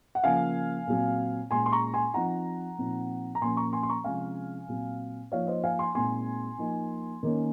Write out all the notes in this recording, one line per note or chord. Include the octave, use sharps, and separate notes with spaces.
F#5
C#3 F3 A#3 F5 G#5
A#2 F#3 C4
A#2 G#3 C#4 G#5 C6
C6
A#5 C#6
G#5 C6
F3 C4 D#4 F#5 A#5
A#2 F3 C4 D#4
A#5
A#2 F3 A#3 C#4 G#5 C6
A#5 C#6
G#5 C6
C6
A#5 C#6
C3 F3 G#3 C#4 F5 G#5
A#2 F#3 C4
F3 A#3 D#4 C#5 F5
C5 D#5
F5 G#5
G#5 C6
A#2 G#3 C4 D#4 G#5 C6
F3 A#3 D#4
D#3 A#3 C#4